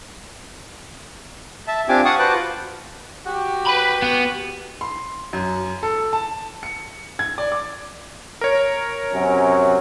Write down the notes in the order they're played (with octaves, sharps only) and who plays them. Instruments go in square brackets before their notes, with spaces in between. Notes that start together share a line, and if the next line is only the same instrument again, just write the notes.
[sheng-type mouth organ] E5 A5
C4 D4 F4 G4 G#5 D6
F5 F#5 A5 C#6 D#6
F#4 B4 C5 A5 D6 F#6
F4
[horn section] F#4 G4
[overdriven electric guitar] B4 B5
B3
[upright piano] C6
F#2
A4
A5
C#7
G#6
D5
D6
[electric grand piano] A#4 C#5
[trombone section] F#2 C3 C#4